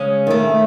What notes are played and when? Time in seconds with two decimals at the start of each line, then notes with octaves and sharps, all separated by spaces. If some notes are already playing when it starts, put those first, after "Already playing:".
Already playing: C#3 G#3 C#4
0.27 D#3 A3